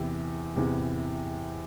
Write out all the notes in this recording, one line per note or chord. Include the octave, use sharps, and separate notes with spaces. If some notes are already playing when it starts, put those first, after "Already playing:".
Already playing: E2 C3 E3 G4
E2 C3 E3